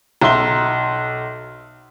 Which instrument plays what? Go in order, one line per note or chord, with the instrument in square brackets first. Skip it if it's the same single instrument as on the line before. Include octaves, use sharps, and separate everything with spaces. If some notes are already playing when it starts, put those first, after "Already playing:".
[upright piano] B1 E5 A#5 C6 G7